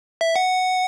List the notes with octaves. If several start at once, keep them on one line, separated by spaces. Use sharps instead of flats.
E5
F#5